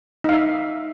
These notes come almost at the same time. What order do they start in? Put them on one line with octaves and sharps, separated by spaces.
D#4 F5 E5